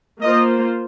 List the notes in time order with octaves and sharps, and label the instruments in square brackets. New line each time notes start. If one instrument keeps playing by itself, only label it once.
[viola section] A#3 F4 C5 [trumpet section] D#5